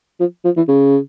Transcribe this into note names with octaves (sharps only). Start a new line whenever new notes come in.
F3
F3
E3
C#3